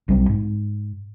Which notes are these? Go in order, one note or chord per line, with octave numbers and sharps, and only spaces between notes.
B1 G3 C4
G#2